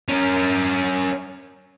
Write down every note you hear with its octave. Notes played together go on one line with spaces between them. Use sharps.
C#4 A#4